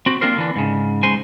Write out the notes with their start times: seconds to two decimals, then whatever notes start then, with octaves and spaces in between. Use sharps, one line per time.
0.06 C4 F#4 G4
0.21 A#3 C4 D4 F4 A#4 C5
0.36 D3 E3 D4
0.56 G#2 C#3
1.03 C#3 G#3 C5 G#5